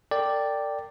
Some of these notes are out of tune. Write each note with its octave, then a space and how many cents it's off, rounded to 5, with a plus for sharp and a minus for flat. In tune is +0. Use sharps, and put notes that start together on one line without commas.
A#4 -45 D5 +0 G5 +0